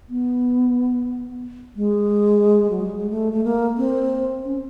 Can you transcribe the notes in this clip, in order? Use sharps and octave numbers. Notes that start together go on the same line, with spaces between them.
B3
G#3
F#3
G3
G#3
A3
A3
A#3
C4
C#4